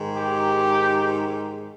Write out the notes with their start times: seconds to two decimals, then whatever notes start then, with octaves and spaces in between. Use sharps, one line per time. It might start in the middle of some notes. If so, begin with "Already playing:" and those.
Already playing: G#2 D#3
0.16 G4